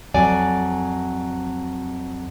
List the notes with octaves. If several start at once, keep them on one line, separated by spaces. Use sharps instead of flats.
F2 F#3 D5 G#5